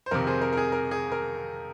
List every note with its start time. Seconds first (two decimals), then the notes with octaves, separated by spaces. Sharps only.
0.06 C5
0.11 F2 C3 D#3 A#4
0.27 G#4 C5
0.41 A#4
0.53 A#4
0.57 G#4
0.72 A#4
0.91 G#4
1.12 A#4